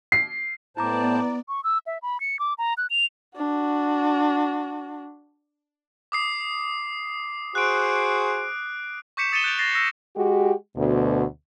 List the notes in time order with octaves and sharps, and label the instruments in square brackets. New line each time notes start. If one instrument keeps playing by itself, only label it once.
[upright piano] C7
[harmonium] A2 C5 A5 [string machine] B3 D5 [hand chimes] E4 A#5 D6
[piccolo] C#6
E6
E5
B5
C#7
D6
A#5
F#6
F7
[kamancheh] D4 F#4
[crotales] D6 D#6 C7
[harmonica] F#4 G#4 C5 [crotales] F#6 D7
[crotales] C#6 D6 G6 B6 C#7 E7
D#6 A6 C#7 D#7 E7 G7
F#6 G6 A6 D7 F7
A6 A#6 C7
E6 A#6
[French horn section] G#3 F#4 G4
D2 B2